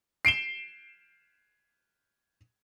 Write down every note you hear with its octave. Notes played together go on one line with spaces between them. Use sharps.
C7 D7 E7 G7